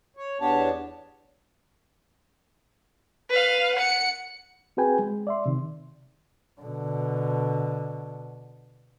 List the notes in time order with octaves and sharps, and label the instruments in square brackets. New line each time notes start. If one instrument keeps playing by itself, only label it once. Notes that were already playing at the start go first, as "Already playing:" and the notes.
[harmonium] C#5
E2 B3 D4 G4 C#5 A5
[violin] B4 F5
F#5 C#7
[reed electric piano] C4 F#4 G#4 B4 G5 G#5
G#3
D5 E5 C6
C3 D#3
[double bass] B2 D3